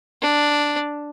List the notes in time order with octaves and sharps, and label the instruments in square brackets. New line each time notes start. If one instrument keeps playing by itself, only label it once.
[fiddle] D4